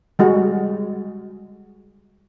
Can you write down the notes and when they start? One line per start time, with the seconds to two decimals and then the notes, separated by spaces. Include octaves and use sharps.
0.19 G3 G#3 F#4